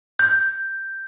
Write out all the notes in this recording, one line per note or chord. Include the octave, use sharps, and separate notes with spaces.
G6